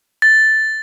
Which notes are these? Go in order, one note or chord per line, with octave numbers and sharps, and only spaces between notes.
A6